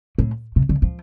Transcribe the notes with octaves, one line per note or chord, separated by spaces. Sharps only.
A2
C3
D3
F3